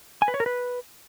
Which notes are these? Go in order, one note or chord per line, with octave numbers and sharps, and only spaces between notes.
G#5
B4
C#5
A#4
B4